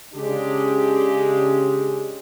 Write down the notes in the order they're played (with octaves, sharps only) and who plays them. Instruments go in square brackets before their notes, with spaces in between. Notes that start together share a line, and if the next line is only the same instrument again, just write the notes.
[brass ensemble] C#3 G#3 D4 G4